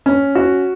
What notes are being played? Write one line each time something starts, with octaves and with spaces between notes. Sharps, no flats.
C#4
F#4